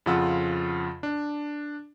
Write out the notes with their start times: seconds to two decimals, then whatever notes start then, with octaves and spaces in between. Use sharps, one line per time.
0.06 F2 C#3 F3 F4 F#5 E6
1.03 D4